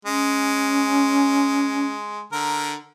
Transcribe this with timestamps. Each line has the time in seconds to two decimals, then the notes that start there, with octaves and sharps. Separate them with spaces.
0.05 G#3 C#4
2.32 D3 A#4